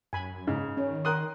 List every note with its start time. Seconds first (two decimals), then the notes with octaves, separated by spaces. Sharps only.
0.13 F#2 G#5 B5
0.47 G#2 C#3 D#4
0.77 D#3 C#4
1.05 A#4 G5 C6 D#6 F#6